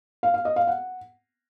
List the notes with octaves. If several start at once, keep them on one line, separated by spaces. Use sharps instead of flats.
F5
F5
D#5
F5
F#5